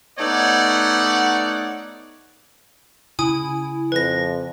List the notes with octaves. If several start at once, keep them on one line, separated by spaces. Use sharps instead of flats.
A3 B3 D#4 C#5 D5 F#5
C#3 E4 G#5 D#6
F2 B4 A#6